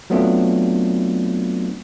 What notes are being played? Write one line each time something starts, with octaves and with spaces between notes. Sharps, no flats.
F#3 A3 B3 C4 D4 F4